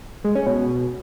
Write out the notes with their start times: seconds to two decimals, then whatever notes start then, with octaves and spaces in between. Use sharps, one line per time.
0.24 G#3
0.35 C#4
0.47 B2